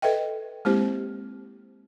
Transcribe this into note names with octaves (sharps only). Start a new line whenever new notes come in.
A4 B4 D#5 E5 G5
G#3 A#3 C4 E4 G4 C5